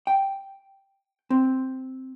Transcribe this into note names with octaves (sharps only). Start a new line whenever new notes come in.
G5
C4